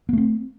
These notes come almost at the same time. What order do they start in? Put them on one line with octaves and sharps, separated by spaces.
B3 A3 C4